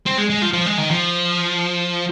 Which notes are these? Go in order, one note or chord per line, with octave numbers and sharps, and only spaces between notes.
C4
G#3
G#3
F3
F3
G#3
D#3
F3